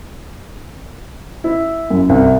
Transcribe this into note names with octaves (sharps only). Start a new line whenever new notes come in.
E4
F#2
C2